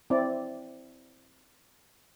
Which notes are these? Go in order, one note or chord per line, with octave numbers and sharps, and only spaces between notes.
C4 E4 D5